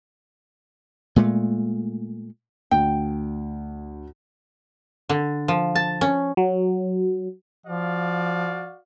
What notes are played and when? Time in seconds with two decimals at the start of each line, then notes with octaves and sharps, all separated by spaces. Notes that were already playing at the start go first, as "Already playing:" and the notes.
1.16 A#2 G#3 A3
2.71 D2 G5
5.09 D3
5.48 F3
5.75 A5
6.01 C#4
6.37 F#3
7.66 F3 F#4 D5 F5